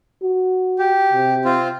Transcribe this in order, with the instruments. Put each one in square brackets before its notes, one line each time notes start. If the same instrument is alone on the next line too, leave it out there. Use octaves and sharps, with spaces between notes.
[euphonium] F#4
[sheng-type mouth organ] G4
[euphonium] C3
[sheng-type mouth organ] C4 F4